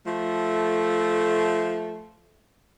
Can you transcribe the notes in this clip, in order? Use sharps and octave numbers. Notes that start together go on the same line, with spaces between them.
F3 A3